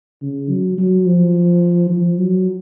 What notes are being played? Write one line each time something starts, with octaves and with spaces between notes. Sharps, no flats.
C#3
F#3
F#3
F3
F3
F#3